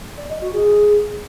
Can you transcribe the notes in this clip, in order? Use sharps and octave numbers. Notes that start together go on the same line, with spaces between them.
D5
D#5
F#4
G#4